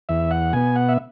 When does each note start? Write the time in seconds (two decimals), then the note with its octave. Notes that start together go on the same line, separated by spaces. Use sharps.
0.09 E2 E5
0.31 F#5
0.53 B2 B3 G#5
0.76 F#5
0.89 E5